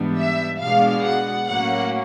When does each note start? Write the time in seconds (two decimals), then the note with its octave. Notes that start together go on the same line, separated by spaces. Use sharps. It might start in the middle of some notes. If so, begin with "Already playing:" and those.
Already playing: G#2 E3 G3 B3 D4
0.19 E5
0.62 B2 G#3 B3 D4 F5
1.05 F#5
1.49 A2 F#3 A#3 C#4 F#5